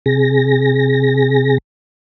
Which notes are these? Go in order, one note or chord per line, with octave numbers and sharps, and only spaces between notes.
C3 G#4 A#6